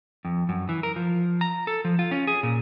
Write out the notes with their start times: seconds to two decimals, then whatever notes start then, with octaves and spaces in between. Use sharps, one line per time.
0.25 F2
0.49 F#2
0.69 E3
0.83 A#4
0.96 F3
1.41 A#5
1.67 A4
1.85 F3
1.99 F4
2.11 C#4
2.27 G#4
2.43 A#2